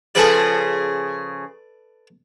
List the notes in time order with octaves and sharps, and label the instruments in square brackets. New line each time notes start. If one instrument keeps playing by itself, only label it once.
[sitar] C#3 F3 G#4 [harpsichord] A4 B4 D5